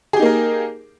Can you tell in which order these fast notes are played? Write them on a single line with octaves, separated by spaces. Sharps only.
G#4 G4 D#4 A#3 A#4